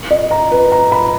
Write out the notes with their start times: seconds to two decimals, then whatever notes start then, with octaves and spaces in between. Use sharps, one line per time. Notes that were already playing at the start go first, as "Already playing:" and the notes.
0.11 D#5
0.31 A#5
0.51 B4
0.72 A#5
0.92 B5